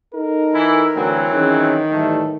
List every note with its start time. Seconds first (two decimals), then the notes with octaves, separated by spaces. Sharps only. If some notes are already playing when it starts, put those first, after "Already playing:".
0.14 D#4 A4 A#4
0.54 E3 E4
0.96 D2 E3 F#3 C4
1.33 D#3 C#4 G#4
1.92 A2 E3 G3 A3